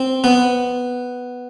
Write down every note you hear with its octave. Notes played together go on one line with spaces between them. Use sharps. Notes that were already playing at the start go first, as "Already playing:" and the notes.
Already playing: C4
B3